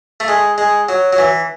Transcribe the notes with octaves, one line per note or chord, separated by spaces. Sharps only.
A3
G#3
G#3
F#3
F#3
E3